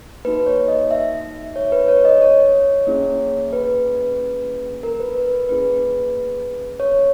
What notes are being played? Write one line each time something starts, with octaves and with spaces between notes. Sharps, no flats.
A#3 D#4 F#4 B4
C#5
D#5
E5
C#5
B4
C#5
D#5
C#5
A#3 C#4 E4 G#4
B4
A#4
B4
B4
A#3 C#4 E4 G#4 B4
C#5